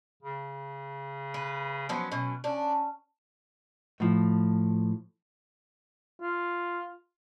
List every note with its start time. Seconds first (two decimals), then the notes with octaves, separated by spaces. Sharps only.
0.23 C#3
1.34 B4
1.89 F3 F#3 B3 C#4
2.12 B2 F#3 C#4
2.44 C#4 D4
4.00 A2 F3
6.21 F4